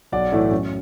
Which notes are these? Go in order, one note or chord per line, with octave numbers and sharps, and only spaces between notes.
B1 D5 F#5
A2 E3 A3
F#2